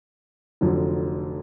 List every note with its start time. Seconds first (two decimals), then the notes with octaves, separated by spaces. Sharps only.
0.61 F1 F2 D3 F#3